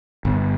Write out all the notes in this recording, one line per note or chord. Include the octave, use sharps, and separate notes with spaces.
G1